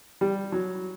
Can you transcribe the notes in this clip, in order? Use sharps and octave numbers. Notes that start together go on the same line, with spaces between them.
G3
F#3